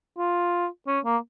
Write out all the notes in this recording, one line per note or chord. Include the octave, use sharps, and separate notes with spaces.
F4
C#4
A#3